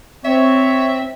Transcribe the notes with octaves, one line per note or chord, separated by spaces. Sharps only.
C4 C#5 E5